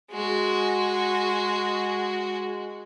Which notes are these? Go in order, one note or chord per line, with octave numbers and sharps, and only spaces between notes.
G#3 F#4